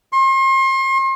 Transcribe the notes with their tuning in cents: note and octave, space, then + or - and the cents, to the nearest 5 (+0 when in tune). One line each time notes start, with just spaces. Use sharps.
C6 +40